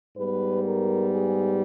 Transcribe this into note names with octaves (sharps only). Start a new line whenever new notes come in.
G#2 G3 B3 B4
A#4
G#4